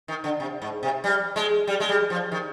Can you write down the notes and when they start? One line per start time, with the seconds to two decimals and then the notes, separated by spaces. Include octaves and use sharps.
0.08 D#3
0.24 D3
0.40 C3
0.62 G#2
0.83 C3
1.04 G3
1.36 G#3
1.67 G3
1.80 G#3
1.89 G3
2.10 F3
2.32 D#3